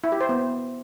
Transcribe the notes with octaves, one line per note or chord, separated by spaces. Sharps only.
E4
G4
C5
B3